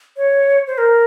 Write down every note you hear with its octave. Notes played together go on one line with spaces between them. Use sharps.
C#5
C5
A#4